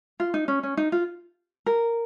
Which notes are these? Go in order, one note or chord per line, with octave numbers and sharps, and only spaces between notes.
F4
D#4
C#4
C#4
D#4
F4
A#4